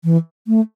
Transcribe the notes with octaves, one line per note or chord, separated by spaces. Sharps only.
E3
A3